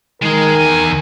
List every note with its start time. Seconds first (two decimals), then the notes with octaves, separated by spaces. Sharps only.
0.22 D#3 G#3 G#4 A#4
0.55 E2 G#5